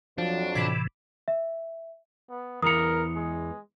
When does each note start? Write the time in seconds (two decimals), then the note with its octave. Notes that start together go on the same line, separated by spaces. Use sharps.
0.18 F2 F3 F#3 D4
0.55 A2 C3 E3 B5 D6
1.28 E5
2.29 B3
2.62 E2 E3 A#4 A#5 D#6 C#7
3.16 G#3